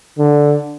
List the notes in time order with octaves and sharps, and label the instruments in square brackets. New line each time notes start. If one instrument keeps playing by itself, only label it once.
[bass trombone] D3